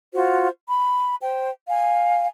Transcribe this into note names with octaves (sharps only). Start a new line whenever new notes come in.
F4 F#4 C5
B5
C5 G5
F5 G#5